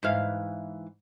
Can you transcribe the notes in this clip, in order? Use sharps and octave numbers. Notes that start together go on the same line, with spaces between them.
G#2 E3 F5